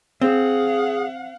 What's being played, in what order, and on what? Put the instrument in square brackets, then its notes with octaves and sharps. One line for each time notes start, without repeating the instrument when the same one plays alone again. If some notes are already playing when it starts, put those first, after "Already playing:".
[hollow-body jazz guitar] C4 [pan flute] G#4 [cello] F5 F#5